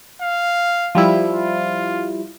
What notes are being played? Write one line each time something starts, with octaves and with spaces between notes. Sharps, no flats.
F5
F3 G3 E4
F4